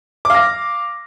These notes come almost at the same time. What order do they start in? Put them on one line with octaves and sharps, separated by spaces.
D6 F5 A#6